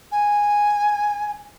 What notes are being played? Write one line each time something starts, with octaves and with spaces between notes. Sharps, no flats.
G#5